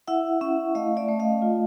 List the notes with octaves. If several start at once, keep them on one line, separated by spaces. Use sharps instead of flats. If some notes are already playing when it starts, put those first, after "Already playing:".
E4 E5 F#5
C#4 E5 F#5
A3 D#5 F5
D5 E5
A3
D#5 F5
F4